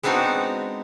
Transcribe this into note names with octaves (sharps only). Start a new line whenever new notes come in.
G#3 B3 C4 D4 D#4 F#4